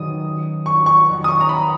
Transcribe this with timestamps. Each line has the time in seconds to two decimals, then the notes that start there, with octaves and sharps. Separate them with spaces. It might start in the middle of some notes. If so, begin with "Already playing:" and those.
Already playing: D#3 F#3 C#4 G#4 B4 D#6
0.66 C#6
0.86 C#6
1.08 F2 D#3 F#3 B3
1.24 D#6
1.28 C#6
1.41 A#5
1.49 B5